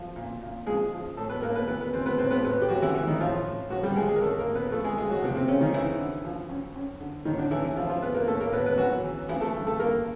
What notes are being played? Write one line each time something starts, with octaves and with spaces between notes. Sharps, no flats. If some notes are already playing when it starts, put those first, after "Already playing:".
Already playing: F3
A#2
A#2
F3 G#3 G#4
F3
A2 A3 A4
B3 B4
A2 A#3 A#4
B3 B4
E3 B3 B4
B3 B4
E3 C4 C5
B3 B4
A2 C4 C5
B3 B4
A2 B3 B4
G4
E3 F#3 F#4
E3 E4
E3 E4
D#3 D#4
A2 F3 F4
A2
F3 F#3 F#4
G3 G4
F3 G#3 G#4
G#3 G#4
A#4
A2 A3 A4
A#3 A#4
A2
B3 B4
F3 A3 A4
G#3 G#4
F3 G#3 G#4
F#3 F#4
C3 F3 C4
C3 C4
F#2 C#3 C#4
D#3 D#4
F#2 E3 E4
D3
F3
F#2
F#2
D3
A2 D#3 D#4
D3 D4
A2 E3 E4
E3 E4
E3 F3 F4
F3 F4
E3 B3 B4
A#3 A#4
A2 A3 A4
A#3 A#4
A2 B3 B4
B3 B4
E3 F#3 F#4
E3
E3 F3 E4
A3 A4
G2
A3 A4
G2 A#3 A#4